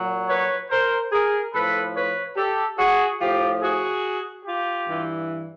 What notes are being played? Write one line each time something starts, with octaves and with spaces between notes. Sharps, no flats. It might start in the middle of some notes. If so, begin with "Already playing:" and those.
Already playing: A#2 F#3
B4 C#5
A#4 C5
G#4 A#4
A2 F3 A4 B4
B4 C#5
G4 A4
F#4 G#4
A2 F3 F4 G4
F#4 G#4
F4 G4
G2 E3